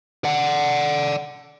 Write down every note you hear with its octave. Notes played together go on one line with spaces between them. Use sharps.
D5 F#5